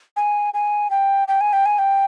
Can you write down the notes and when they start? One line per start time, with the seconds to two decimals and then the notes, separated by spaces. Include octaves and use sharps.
0.17 G#5
0.54 G#5
0.91 G5
1.28 G5
1.41 G#5
1.53 G5
1.66 G#5
1.79 G5